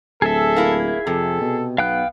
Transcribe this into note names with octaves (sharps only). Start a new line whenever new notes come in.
D1 G#4 A4 E5
A#3 E4
F2 C3 A4
B2
B1 B3 F5 G5 F#6